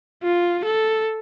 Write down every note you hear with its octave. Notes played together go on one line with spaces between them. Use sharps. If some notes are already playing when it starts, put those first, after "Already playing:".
F4
A4